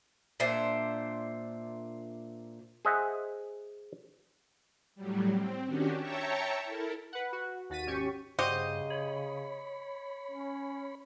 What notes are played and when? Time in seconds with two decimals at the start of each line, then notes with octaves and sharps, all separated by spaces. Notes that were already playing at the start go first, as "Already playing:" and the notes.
0.40 A#2 D4 C5 E5
2.85 G#4 C5 D#5 E5 F#5 G#5
4.95 A2 F#3 G3
5.32 C4
5.66 D#3 C#4 D4 F#4 G4
5.98 C#5 E5 G5 A5 A#5 C#6
6.65 E4 A4 A#4
7.13 B4 F#5
7.33 F#4
7.70 D#2 F#4 A6 B6 D#7
7.86 G#1 C#4 G4 C#6
8.39 G2 C#3 F#4 G4 C5 D#5
8.91 C#5 B5
10.31 C#4